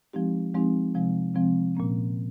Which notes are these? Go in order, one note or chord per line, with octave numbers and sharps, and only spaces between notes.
F3 G#3 C4 D#4 G4
F3 G#3 C4 D#4 G4
C3 F3 G#3 C4
C3 F3 G#3 C4
A#2 F3 A#3 C#4